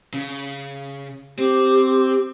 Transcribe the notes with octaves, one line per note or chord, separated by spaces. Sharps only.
C#3
C4 G4